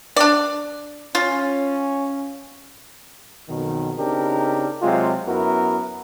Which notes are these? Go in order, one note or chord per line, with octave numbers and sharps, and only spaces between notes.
D4 D5
C#4 F4
B1 F2 B2 D#3
C#3 C4 D4 D#4 G4 A#4
C3 F#3 G#3 F4
F#2 B3 E4 F#4 A#4